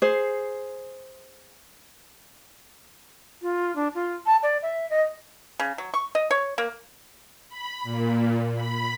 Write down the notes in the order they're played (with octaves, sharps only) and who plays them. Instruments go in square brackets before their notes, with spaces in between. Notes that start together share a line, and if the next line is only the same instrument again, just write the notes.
[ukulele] G#4 C5
[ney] F4
D4
F4
A5
D5
E5
D#5
[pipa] C#3
F#3
C#6
D#5
C#5
A#3
[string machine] B5
A#2
B5